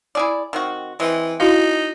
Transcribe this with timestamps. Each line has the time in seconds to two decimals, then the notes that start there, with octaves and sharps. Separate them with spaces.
0.15 E4 G#4 D5
0.53 D#3 C4 F#4
1.00 E3 G#3 C4
1.40 D#4 E4 F#4 F5